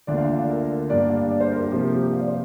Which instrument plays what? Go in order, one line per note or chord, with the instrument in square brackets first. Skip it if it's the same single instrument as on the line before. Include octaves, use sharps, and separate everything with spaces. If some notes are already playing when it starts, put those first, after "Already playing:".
[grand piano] D2 D3 A#3 D4 F4 [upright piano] D5
[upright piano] F5
F5
D5
A#4
[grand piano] G2 G3 A#3 D4 [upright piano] D5
[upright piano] F5
D5
C5
A#4
G4
[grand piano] C3 F3 A#3 [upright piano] G4
[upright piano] G4
F5
D5
C5